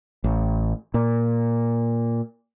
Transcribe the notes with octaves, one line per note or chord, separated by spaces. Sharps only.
A1
A#2